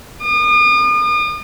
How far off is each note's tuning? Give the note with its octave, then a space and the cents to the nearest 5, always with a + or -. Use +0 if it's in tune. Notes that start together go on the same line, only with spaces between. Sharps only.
D#6 -40